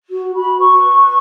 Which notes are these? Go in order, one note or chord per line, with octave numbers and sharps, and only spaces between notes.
F#4
F#4 B5
B4 C#6
B4